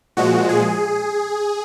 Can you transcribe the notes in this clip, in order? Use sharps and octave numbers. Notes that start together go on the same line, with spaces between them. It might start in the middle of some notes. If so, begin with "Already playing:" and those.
A#2 F3 G#3 F#4
G#4